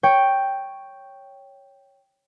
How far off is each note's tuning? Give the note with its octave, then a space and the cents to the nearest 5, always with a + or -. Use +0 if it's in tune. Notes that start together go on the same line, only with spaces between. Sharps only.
C#5 +0 G5 +0